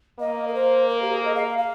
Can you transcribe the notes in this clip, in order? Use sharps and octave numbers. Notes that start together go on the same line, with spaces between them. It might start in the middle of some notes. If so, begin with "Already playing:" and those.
A#3 D#5
A#4
C5
A#4
G4
G#4
D#5
F5
F5